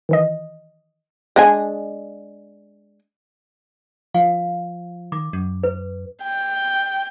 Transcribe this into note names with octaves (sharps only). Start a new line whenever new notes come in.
D#3 E3 D#5
G#3 D4 G#5
F3 F5
D#3 D6
F#2
B4
G5